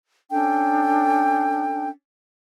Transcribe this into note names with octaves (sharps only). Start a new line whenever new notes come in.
C#4 D4 A4 G5